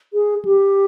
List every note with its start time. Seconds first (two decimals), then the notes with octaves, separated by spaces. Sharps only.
0.14 G#4
0.45 G4